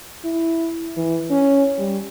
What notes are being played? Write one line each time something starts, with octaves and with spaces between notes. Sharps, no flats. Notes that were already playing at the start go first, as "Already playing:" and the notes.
E4
E3
C#4
G3